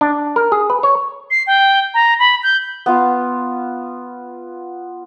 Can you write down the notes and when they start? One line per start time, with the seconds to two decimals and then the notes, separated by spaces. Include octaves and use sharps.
0.01 D4
0.36 A#4
0.52 G#4
0.70 B4
0.83 C#5
1.31 C7
1.47 G5
1.94 A#5
2.19 B5
2.43 G6
2.86 B3 F4